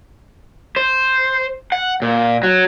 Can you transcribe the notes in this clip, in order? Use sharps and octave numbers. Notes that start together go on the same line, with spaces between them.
C5
F#5
A#2
F#3